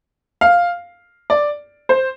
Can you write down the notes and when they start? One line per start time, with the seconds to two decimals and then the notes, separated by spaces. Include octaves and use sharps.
0.41 F5
1.30 D5
1.89 C5